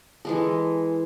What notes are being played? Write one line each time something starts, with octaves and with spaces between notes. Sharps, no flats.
E3 G#3 A4